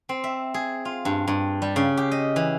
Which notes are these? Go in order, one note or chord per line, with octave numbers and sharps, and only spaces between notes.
C4
E5
G#4
F4
G2
G2
G3
C#3
G4
D#5
E3